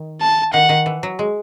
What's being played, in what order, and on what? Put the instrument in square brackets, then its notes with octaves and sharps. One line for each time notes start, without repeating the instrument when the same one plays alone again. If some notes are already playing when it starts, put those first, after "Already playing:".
Already playing: [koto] D#3
[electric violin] A5
[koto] D#3 [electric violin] F#5
[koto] D#3
E3
F#3
G#3